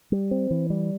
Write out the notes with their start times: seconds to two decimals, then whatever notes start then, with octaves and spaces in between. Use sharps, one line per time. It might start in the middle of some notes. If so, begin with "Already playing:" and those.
0.12 G3
0.31 C4
0.51 E3
0.70 G3